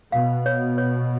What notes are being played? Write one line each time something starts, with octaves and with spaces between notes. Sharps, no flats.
B2 F5
C#5
C#5